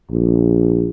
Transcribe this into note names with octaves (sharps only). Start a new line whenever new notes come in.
A#1